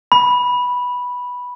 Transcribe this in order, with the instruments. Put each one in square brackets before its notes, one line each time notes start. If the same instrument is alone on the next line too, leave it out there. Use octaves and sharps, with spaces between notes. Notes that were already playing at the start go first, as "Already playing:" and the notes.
[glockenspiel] B5